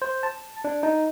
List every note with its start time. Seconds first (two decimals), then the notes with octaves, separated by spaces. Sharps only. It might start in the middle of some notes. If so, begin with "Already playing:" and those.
0.02 C5
0.23 A5
0.64 D4
0.83 D#4